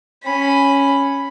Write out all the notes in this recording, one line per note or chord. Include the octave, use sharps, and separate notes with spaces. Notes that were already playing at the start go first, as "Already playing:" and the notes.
C#4 B5